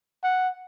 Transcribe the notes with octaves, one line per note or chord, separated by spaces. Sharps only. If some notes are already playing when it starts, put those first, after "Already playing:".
F#5